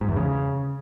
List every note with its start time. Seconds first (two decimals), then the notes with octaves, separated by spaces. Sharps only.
0.01 G#2
0.09 E2
0.16 C#3